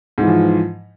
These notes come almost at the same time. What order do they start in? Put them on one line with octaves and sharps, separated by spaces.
G#2 E3 F3